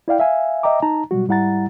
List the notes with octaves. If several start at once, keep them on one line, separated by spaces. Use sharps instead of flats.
E4 D5 F5 G5
E5 F5 G#5
D#5 E5 G5 A#5 D6
D#4 A5 A#5
B2 F#3 G3 F#4
G#2 G3 E4 F#5 A#5 A6